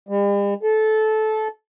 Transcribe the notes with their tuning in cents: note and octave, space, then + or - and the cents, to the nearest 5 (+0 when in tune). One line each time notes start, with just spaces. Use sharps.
G3 +45
A4 -20